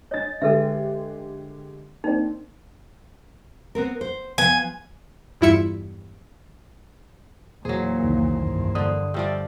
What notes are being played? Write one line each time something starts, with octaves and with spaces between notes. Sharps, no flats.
D4 C#5 D#5 A6
D3 G#3 G4 A4 B4 E5
A#3 C4 D4 D#4
B3 C4 A#4
C5
F3 B3 G#5
E2 G2 E4 F4 E5 C#7
E2 A#2 F#3 A#3 G#4 C5
C2 F2 D#3
G2
D3 D#6
G2 F3 D5 E5 G5